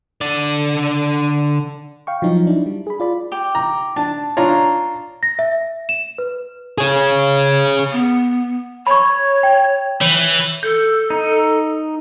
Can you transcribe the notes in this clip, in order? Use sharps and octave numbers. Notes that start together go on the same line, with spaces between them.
D3 D5
F5 G5 C#6
F3 F#3 D#4
D4 E4
G3
G#4 B5
F4 D5 B5
G4
A#5
D4 A5
D4 F4 C#5 A#5
A#6
E5
E7
B4
G#4 C#5
B3
C#5 B5 C#6
G5
E3 C#5
A4 G6
D#4